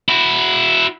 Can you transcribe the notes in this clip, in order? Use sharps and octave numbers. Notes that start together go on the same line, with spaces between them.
E4 F#4